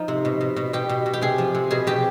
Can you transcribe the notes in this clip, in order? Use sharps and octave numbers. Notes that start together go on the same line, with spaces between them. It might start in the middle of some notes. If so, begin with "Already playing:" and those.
Already playing: F3 D#4
C3
B2
B2
B2
B2 G4
B2
B2
G4
C3 G#4
F3
C3
B2 G#4
B2 G4